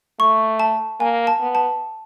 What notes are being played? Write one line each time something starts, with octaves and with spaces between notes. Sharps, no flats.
A3 C#6
A5
A#3 G#5
A5
B3
A5